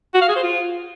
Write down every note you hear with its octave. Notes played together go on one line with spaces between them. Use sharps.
F#4
F5
G#4
C5
F4